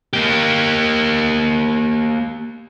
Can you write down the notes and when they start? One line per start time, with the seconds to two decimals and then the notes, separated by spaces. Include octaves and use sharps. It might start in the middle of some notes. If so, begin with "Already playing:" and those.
0.13 A#3 G4